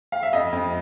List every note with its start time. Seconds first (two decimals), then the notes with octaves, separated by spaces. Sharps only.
0.12 F5
0.23 E5
0.33 F2 D#5
0.52 F2